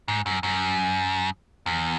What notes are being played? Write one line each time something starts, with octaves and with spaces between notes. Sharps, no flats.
G#2
F#2
F#2
E2